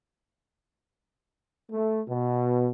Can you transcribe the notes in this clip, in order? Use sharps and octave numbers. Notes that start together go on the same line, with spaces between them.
A3
B2